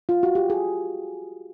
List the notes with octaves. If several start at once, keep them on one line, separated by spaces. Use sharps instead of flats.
F4
F#4
G4
G#4